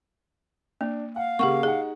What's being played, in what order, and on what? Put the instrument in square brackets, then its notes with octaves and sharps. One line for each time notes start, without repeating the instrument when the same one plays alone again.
[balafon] A#3 [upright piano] D4
[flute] F5 [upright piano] F#5
[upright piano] C#3 A#3 [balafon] G4 F#5 C#6
[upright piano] D#4 F#5 [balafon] G#4